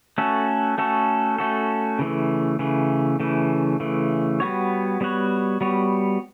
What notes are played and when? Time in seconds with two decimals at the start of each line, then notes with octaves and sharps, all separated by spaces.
0.18 A3 C#4 F#4 A4
0.78 A3 C#4 F#4 A4
1.38 A3 C#4 F#4 A4
1.99 C#3 E3 A3
2.59 C#3 E3 A3
3.20 C#3 E3 A3
3.80 C#3 E3 A3
4.40 G3 B3 F#4 C#5
5.01 G3 B3 F#4 C#5
5.61 G3 B3 F#4 C#5